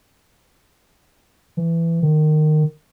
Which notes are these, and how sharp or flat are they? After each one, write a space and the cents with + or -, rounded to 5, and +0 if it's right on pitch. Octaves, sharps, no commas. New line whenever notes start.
E3 +15
D#3 -20